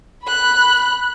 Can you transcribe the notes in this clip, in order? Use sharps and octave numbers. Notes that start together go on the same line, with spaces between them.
B5 F#6